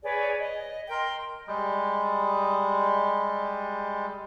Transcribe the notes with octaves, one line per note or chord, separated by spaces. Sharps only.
G#4 B4 C#5 D5
D#5
A#4 G5 C6
G3 G#3